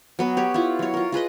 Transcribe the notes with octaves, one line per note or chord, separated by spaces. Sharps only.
F#3 B3 B4
G4 C#5
E4 F4
F#3 C#5
F4 A#4
F4 G#4 B4 D#5